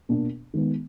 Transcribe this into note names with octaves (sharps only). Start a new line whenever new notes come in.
B2 A#3 D4
D#3 G#3 B3